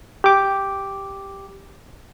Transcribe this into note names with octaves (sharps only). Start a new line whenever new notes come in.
G4 D6